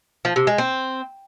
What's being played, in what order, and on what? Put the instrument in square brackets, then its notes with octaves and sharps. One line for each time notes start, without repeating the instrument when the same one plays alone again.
[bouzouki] F3
C3
G#3
C4